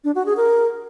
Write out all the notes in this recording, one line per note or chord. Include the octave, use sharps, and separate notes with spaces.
D4
F#4
G#4
A#4